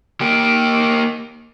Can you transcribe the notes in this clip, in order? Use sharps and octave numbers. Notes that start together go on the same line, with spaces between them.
A#3 G4